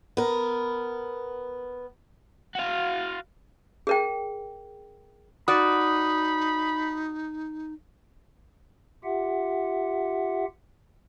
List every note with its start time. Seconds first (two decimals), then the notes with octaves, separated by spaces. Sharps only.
0.17 B3 A#4
2.55 F#4 F5
3.87 G#4 A#4 G5
5.48 D#4 F#4 D5 B5 D#6
9.04 F4 G4 E5 F#5